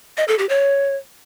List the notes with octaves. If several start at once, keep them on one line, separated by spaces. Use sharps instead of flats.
D#5
A4
G4
C#5